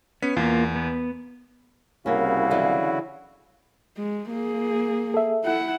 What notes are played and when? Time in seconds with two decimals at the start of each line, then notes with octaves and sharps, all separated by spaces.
0.22 B3 C#4 B6
0.37 E2 A#3 F4
0.75 B3
2.06 C2 C#3 A#3 C#4 E4 F#4 F5
2.51 D3 E3 F#3
3.97 G#3
4.30 A#3 G#4
5.14 A4 E5
5.45 E4 F#5